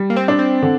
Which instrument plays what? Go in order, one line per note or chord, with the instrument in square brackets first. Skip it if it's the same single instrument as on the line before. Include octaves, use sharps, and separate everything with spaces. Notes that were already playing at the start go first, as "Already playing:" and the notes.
Already playing: [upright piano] G3
[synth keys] A#3
C4
[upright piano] D4
[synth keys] C4
[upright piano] D3